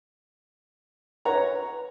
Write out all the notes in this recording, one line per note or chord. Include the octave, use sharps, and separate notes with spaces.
B4 C#5 F#5 A#5